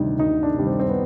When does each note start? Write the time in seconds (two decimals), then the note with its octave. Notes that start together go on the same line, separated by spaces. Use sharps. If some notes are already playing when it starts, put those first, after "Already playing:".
Already playing: D2 C3 D#3 G3 D#4
0.19 D2 D#4
0.43 D4
0.54 C3 D#3 G3
0.67 C4
0.80 C4
0.89 B3